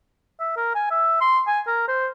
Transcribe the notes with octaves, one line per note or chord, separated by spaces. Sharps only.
E5
A#4
G#5
E5
C6
G#5
A#4
C5